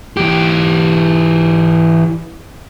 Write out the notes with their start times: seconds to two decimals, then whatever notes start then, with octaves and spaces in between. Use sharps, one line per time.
0.17 E3 G4